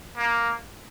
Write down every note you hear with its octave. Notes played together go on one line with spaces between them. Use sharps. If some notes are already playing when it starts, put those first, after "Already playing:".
A#3